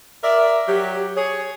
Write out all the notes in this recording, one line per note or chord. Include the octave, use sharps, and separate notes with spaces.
A#4 D5 E5
F#3 G4
G#4 C#5